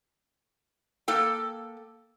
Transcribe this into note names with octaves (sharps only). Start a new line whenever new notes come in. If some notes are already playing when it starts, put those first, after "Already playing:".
A#3 A4 G5